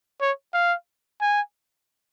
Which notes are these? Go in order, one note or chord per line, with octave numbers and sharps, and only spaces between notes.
C#5
F5
G#5